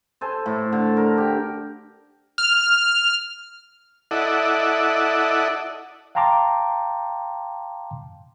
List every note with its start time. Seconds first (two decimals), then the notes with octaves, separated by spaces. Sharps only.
0.21 A4 C5 G#5
0.46 A2
0.72 D3
0.97 A#4
1.18 G4
2.38 F6
4.11 E4 A4 D5 D#5 F#5
6.15 F5 G5 A5 A#5 C6 D6